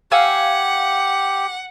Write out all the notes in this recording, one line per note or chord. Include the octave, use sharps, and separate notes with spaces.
G4 F5 F#5 G#5 E6